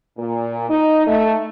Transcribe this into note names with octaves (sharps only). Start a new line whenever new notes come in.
A#2
D#4
A3